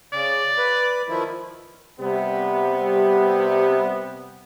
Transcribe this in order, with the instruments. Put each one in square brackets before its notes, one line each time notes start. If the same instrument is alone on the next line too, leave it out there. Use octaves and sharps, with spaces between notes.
[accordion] C#3 [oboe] D5
[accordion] B4
D#3 F3 E4
[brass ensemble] C3 G3 B3